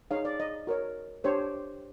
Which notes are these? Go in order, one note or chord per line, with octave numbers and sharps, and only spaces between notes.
D#4 G#4 C#5 F5
D5
D#5
F#4 A#4 C#5
D4 G4 C5 C#5